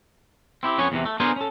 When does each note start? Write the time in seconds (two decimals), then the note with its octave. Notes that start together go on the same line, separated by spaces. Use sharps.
0.63 C4 E4 G4
0.78 F2 B3 C#4 C#5 G#5
0.92 E2 C3 E3
1.05 A3
1.20 B3 D4 G#4 A#4 C5 G#5
1.36 C#4 A4